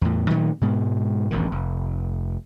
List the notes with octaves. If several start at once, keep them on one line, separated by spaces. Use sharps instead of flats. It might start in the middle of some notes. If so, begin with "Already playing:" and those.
E2 A2
A#2 D#3 F#3 A3
G#2 B2 G#3
E1 A1 F#2 D#3
F1